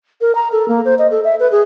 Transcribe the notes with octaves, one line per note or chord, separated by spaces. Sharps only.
A#4
A#5
A4
A#3
C5
D#5
A4
E5
B4
G#4